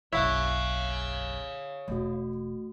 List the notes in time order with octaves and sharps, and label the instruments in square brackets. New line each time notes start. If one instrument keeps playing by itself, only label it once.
[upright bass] F#1 B1 [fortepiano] E4 [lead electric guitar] C#5 F5 [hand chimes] C#6 F#6
[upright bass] E1 [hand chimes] A3 F#4